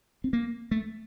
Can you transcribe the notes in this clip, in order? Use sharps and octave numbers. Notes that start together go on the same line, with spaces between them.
C4
A#3
A3